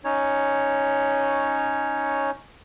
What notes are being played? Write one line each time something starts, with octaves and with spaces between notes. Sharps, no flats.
C#4 D#4 C#5